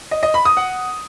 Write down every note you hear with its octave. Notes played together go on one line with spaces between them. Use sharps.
D#5
D#5
B5
D#6
F#5